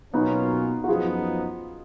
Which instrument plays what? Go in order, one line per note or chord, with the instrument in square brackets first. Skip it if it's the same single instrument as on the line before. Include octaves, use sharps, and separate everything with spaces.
[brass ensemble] B2 F#3 A#3 C#4 F4 [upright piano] B3 D#4
[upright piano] F#4
[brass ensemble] F#2 F3 B3 D#4 [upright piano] F4 G#4